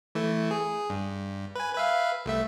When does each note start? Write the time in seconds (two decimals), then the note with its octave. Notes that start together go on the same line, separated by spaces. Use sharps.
0.15 E3 A3
0.51 G#4
0.90 G2
1.55 B4 G#5
1.75 B4 E5 F5
2.26 C2 A3 E5